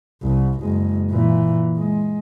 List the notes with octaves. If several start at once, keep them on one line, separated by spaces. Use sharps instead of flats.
C2
F#1 G#3
A#2 E3
G#3